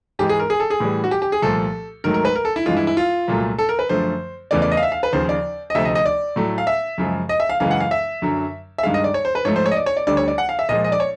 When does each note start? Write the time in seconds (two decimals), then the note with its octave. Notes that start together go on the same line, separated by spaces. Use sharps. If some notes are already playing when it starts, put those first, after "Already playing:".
0.19 G#2 E3 G#3 G4
0.29 G#4
0.40 A#4
0.50 G#4
0.60 A4
0.70 G#4
0.80 A2 E3 G3
1.04 F#4
1.11 G4
1.22 G4
1.32 G#4
1.42 C2 A#2 F3 A3 A4
2.04 G#2 D#3 F#3 A3 A#4
2.14 A#4
2.25 B4
2.36 A#4
2.45 A4
2.56 E4
2.66 G2 E3 G#3 F4
2.77 E4
2.87 E4
2.97 F4
3.28 C2 A#2 F#3 A3
3.58 A4
3.69 A#4
3.79 B4
3.89 F#2 D3 F3 A3 C5
4.51 E2 C#3 E3 A3 D5
4.62 D5
4.72 D#5
4.77 F5
4.83 E5
4.92 F5
5.03 B4
5.13 D#2 C#3 F3 C5
5.29 D5
5.70 D#5
5.75 D2 C3 F3 A3 E5
5.85 D#5
5.95 D#5
6.06 D5
6.36 A2 F#3 A3
6.58 F5
6.67 E5
6.98 F#2 C#3 F3 G#3
7.29 D#5
7.40 E5
7.49 F5
7.60 F#2 C#3 E3 G#3 F5
7.71 F#5
7.80 F5
7.91 E5
8.22 F#2 D3 F#3
8.78 E5
8.83 G2 D#3 G#3 F5
8.94 D#5
9.04 D5
9.14 C#5
9.25 C5
9.35 B4
9.45 G#2 F3 A3 C#5
9.56 C5
9.66 C#5
9.71 D#5
9.76 D5
9.86 C#5
9.97 D5
10.07 D2 D3 G3 D5
10.17 C#5
10.28 D5
10.38 F#5
10.49 F5
10.59 E5
10.69 A#2 F3 G#3 D#5
10.84 D#5
10.92 D5
11.00 C#5